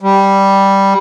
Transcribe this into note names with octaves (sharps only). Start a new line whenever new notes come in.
G3